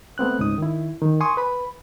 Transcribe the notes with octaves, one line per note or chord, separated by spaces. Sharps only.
A3 B3 C4 F#6
C#2 G#2 C#4 D#4 D#6
D#3 E4
D#3
G#5 C6 C#6 D#6
B4 B5